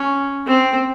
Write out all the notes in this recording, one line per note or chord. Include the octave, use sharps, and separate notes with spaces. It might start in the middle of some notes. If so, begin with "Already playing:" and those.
Already playing: C#4
C4